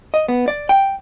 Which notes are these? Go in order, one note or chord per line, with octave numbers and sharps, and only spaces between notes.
D#5
B3
D5
G5